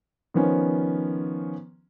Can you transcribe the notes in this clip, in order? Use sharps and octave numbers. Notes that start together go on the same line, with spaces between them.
D#3 F3 B3 C#4